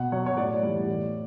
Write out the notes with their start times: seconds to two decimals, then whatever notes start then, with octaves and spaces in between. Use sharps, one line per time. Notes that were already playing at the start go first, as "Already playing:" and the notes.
Already playing: B2 F#5
0.12 F#3 C#5
0.26 C#5
0.37 A2 D5
0.63 E3 G3
0.88 A2